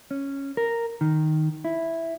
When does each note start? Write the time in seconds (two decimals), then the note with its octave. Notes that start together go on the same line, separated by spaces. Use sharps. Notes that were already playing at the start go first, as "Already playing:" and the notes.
0.11 C#4
0.57 A#4
1.01 D#3
1.65 E4